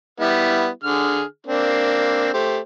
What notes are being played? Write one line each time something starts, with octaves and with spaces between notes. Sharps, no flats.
G3 B3 E4
D3 G#4 F6
A#3 C4 D4
A3 G4 C5